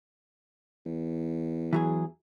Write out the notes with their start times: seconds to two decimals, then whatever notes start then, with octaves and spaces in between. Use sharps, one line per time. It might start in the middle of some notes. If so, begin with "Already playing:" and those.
0.86 E2
1.73 E3 F#3 G#4